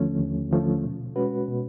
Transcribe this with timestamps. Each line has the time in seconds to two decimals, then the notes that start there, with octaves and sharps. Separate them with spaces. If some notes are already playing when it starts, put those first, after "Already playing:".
Already playing: D#2 D3 F3 A3 C#4
0.19 D#2
0.51 D3 F3 A3 C#4
0.83 B2
1.16 G#3 C#4 F#4 B4
1.48 B2